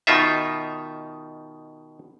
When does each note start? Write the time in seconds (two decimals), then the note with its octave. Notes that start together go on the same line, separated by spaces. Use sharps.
0.07 B2 D#3 D#4 F4 E5